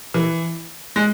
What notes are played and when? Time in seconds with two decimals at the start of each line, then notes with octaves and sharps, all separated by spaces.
0.14 E3
0.96 G#3